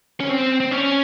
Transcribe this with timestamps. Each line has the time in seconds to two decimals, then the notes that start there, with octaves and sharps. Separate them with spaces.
0.20 C#4
0.29 C4
0.60 C4
0.71 C#4